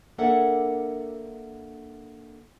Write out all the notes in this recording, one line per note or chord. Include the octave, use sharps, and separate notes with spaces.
A#3 D4 A4 A#4 E5 F#5